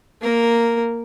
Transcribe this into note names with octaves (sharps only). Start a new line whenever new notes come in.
A#3 A#4